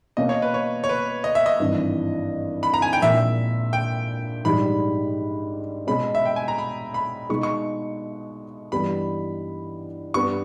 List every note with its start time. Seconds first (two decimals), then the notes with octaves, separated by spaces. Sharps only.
0.17 B2 A#3 C#4 D#5
0.29 C#5
0.42 B4
0.54 C#5
0.84 C#5
0.89 B4
1.24 D#5
1.35 E5
1.46 D#5
1.60 G#1 G2 E3
2.63 B5
2.74 A#5
2.82 G#5
2.93 G5
3.02 A#1 A#2 G#3 E5
3.73 G5
4.45 A#1 G#2 G3 B5
5.87 B2 G#3 C#4 B5
6.15 E5
6.25 G5
6.36 G#5
6.48 A#5
6.58 B5
6.94 B5
7.29 B2 G#3 D#4 C#6
7.43 C#6
8.72 G2 E3 G3 B3 B5
10.14 G2 G3 B3 C#6